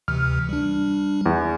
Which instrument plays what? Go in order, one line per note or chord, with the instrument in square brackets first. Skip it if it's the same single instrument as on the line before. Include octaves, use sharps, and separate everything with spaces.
[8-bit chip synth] D2 C3 E3 [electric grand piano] F6
[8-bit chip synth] G3 D4
[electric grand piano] E2